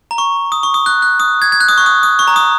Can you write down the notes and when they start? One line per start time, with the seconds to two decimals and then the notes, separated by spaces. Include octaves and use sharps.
0.11 A#5
0.18 C#6
0.52 D#6
0.63 C#6
0.74 D#6
0.86 F#6
1.02 F#6
1.20 D#6
1.42 G#6
1.52 G#6
1.60 F#6
1.69 D#6
1.78 C#6
1.86 D#6
2.03 D#6
2.19 C#6
2.27 A#5
2.36 D#6